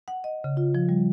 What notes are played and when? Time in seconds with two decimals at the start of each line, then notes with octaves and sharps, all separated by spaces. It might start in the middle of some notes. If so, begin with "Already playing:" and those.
0.08 F#5
0.24 D#5
0.44 C#3
0.57 F4
0.75 F3
0.89 G3